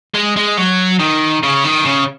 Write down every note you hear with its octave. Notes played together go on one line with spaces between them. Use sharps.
G#3
G#3
F#3
D#3
C#3
D#3
C#3